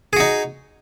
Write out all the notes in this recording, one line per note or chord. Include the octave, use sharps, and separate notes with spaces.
D#4 F#4 G#4